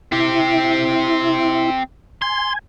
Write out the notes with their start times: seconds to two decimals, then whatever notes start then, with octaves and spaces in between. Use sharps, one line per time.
0.12 C4 E4 G4
2.22 G#5 C6